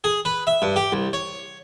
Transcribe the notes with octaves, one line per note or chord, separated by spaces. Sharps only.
G#4
B4
E5
G2
G4
C2
C#5